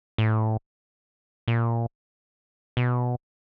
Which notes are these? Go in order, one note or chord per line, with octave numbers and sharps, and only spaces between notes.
A2
A#2
B2